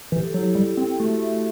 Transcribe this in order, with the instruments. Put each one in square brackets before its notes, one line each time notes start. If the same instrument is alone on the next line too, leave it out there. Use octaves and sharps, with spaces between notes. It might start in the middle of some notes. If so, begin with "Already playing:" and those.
[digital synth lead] E3 [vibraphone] G4
[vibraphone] A4
[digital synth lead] F#3 [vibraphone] E4 G4
[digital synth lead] G3
C4
[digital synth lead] A3 [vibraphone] F#4 A4